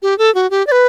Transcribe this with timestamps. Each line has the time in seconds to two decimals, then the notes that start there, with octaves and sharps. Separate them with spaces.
0.02 G4
0.18 A4
0.35 F#4
0.51 G4
0.67 D5
0.72 B4